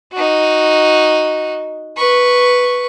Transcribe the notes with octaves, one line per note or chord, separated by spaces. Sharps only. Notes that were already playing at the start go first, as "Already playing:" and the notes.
D#4 F#4
B4 C#6